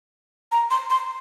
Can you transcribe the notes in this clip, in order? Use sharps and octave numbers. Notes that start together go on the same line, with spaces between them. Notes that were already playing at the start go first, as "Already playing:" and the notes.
A#5
C6
C6